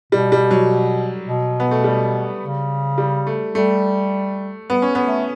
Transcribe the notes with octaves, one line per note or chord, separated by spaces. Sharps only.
B2 G3
G3
F#3
B2
B3
A3
G3
C#3
G3
A3
G3 A3
G3 B3
C#4
B3
A3